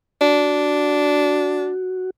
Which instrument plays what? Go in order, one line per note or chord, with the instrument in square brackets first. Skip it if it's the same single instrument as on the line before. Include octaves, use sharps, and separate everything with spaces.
[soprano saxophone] D4 [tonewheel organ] F#4